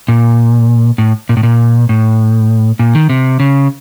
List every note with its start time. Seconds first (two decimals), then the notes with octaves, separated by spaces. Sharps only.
0.08 A#2
0.98 A2
1.29 A#2
1.37 A2
1.43 A#2
1.89 A2
2.79 A#2
2.95 D#3
3.09 C3
3.40 C#3